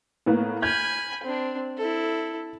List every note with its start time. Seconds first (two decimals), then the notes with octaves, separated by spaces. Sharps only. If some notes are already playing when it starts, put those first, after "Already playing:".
0.26 A2 A#3 B3
0.62 G#5 B5 F6 G6 G#6
1.23 C4 D4
1.77 E4 A4